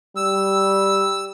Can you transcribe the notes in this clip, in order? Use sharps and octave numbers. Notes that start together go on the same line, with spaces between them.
G3 E6